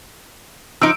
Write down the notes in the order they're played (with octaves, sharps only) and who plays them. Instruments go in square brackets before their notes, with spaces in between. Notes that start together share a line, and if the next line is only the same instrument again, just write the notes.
[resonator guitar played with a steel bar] F3 D#4 [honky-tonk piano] E6 D7